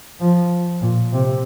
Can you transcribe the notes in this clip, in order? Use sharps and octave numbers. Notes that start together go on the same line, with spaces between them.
F3
A#2
C3